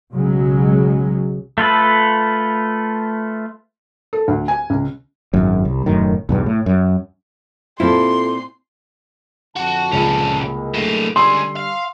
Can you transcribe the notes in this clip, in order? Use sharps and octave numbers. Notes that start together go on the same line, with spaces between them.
B1 C#3 F#3 G#3
A3 F4 A4 B4
A4
D2
G#5
C#2
G#1 F#2
C2
E1 F#2 A2 D#3
B1 E2 G2
A2
F#2
A#2 C4 E4 F4 A4 C6
F2 D3 F#4 A5
C#2 A#2 C#4
C2 G#3 A#3
A2 D3
C#2 D3 G3 G#4 C6 E6
F5